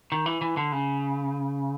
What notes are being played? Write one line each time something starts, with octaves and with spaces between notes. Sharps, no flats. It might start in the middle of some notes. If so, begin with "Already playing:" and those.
D#3
E3
E3
D3
C#3